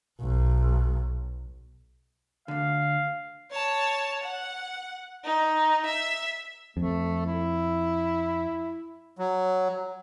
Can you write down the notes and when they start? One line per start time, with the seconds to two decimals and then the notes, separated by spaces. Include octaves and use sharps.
0.21 B1
2.48 D2 D3 F5
3.51 C#5 A5
4.23 F#5
5.24 D#4
5.86 E5
6.77 F2 A3
7.26 E4
9.18 F#3